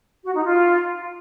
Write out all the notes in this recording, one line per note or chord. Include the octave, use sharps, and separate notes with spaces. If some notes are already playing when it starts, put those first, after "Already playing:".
F#4
D#4
F4